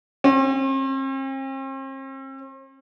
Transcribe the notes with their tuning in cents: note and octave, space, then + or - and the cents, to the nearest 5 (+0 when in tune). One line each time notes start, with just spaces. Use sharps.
C4 +45